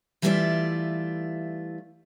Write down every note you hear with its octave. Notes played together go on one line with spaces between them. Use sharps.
E3 G3 A3 E4 F4 D5